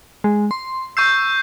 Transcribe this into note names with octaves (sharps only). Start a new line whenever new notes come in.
G#3
C6
C#6 E6 G6 C7